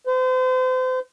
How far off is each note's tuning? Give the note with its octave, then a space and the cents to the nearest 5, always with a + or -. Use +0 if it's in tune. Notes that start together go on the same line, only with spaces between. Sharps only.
C5 -35